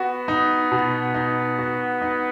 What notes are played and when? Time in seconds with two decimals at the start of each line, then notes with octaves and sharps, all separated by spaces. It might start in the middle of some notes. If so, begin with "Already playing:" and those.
Already playing: B3 F#4
0.28 D#4
0.72 B2
1.14 D#4
1.59 F#4
2.02 D#4